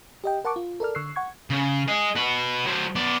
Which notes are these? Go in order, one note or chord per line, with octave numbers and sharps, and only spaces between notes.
G4 D#5 G5
A#4 F#5 A5 C#6 D6
F4
A4 A#4 D5 F6
D3 C#6 E6 F#6 C7
F#5 C#6 G#6
C#3
G#4 D#5
F#4 B4
F#3 C5
B3 D5